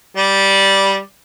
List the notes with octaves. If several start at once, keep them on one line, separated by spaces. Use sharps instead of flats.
G3 D5